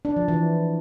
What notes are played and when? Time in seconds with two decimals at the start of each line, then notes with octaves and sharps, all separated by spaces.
0.05 D4
0.17 F3
0.28 E3